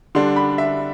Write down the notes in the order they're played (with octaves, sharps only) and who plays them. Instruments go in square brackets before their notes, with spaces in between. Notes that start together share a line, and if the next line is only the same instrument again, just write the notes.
[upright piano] D3 G3 D4 C6
B5
E5